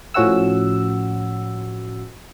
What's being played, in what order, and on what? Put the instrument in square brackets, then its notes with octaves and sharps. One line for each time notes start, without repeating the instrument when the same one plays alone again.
[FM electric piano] A2 F3 C#4 F#4 F#5 E6